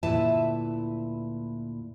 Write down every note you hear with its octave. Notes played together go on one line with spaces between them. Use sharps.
D2 A#2 E4 B4 E5 A5